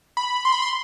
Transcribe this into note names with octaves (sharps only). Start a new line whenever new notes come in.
B5
C6
B5
C6